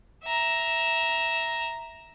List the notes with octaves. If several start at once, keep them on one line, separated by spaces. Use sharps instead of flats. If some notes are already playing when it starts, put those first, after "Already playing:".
E5 A#5